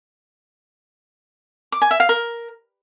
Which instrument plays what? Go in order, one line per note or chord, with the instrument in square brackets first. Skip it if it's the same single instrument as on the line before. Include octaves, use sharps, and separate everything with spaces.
[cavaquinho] D6
G#5
E5
F5
A#4